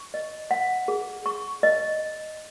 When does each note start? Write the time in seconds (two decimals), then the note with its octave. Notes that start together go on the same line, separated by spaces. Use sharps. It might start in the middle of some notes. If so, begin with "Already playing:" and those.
Already playing: C#6
0.14 D#5
0.51 F#5
0.88 G#4
1.26 C#6
1.63 D#5